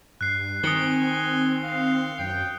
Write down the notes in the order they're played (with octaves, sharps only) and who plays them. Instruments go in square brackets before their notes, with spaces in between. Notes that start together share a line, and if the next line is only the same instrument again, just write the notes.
[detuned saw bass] G2 [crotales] F#6 C7
[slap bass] D#3 [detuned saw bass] C4 [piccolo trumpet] G#5 [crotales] D#6 C#7 G7
[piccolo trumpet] F5
[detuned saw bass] F#2 [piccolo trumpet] G5